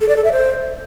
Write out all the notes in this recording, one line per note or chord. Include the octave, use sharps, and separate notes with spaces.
A4
D5
A4
E5
C5